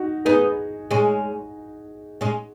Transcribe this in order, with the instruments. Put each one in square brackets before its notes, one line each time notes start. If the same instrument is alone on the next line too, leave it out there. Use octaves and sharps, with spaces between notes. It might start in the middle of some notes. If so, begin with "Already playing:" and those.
Already playing: [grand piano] D#4 F#4
[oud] B3 D#4 [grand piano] G#4
[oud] G#3 C#4
G#3 C#4